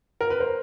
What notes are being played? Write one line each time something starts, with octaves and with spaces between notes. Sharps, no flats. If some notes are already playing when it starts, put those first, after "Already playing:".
A#4
B4
A#4 C5